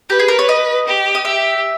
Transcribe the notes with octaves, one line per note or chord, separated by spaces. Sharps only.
G4 B4
G#4
A#4
C#5
D#5
G4
D#5
G4 E5